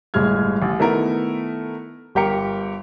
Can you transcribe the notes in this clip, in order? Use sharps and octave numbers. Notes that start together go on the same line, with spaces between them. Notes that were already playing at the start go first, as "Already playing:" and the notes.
G1 A2 G3 G#3 F6 G#6
A1
D#3 A3 B3 E4 A4 A#4
G1 G4 A#4 C#7